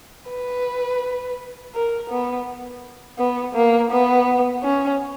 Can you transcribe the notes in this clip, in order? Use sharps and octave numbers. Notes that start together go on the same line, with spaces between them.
B4
A#4
B3
B3
A#3
B3
C#4